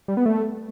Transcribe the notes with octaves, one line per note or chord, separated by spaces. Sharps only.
G3
B3
A3